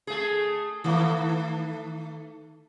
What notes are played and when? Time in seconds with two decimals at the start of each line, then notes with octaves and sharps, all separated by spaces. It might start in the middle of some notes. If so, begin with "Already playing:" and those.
0.07 A3 G#4
0.84 D#3 A3